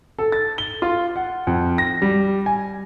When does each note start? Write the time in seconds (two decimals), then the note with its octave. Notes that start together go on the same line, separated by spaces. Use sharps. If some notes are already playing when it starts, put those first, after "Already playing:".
0.19 A4
0.32 A6
0.58 G7
0.82 F4
1.16 F#5
1.47 F2
1.78 A#6
2.02 G3
2.46 G#5